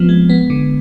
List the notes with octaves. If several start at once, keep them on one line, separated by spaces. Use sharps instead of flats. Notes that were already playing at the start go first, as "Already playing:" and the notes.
Already playing: F3 B3 C4
G#3
B3
D3